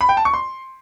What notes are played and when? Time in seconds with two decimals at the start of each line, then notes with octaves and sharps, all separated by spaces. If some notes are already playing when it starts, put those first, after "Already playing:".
0.01 B5
0.09 G5
0.17 A5
0.25 C#6
0.34 C6